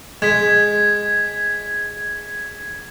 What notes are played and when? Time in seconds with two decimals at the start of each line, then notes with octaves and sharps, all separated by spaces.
0.22 G#3 G#6 B6